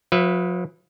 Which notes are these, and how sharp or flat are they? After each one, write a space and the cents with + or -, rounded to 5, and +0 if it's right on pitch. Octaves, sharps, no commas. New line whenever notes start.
F3 +45 B4 +0 E5 +30